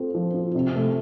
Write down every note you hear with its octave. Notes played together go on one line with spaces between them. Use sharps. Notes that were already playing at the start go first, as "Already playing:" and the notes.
Already playing: C4 F4 A4
F3
F4
C3
A3